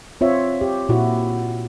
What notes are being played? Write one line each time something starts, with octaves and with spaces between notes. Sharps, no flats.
C4 F4 C#5 E5
G4
A#2 E4 F#4